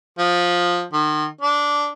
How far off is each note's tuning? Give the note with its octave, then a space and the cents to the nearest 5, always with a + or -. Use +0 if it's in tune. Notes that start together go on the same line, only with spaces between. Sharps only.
F3 +15
D#3 -35
D4 -10